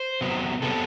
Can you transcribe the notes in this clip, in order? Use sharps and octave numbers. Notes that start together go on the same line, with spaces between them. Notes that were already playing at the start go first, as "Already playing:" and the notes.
Already playing: C5
C3 F#3 B3
C3 F#3 B3 A4